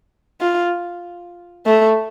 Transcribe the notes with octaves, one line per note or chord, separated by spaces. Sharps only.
F4
A3